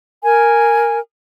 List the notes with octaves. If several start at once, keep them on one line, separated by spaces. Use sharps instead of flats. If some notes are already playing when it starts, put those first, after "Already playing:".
A#4 G#5